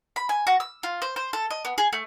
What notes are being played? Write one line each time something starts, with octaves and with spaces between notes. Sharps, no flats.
B5
G#5
F#4
E6
F4
C5
C5
A4
D#5
B3
G#4
A3